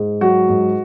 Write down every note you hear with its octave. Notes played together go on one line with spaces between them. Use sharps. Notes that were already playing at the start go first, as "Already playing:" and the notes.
Already playing: G#2 G#3
F#3 F#4
G#2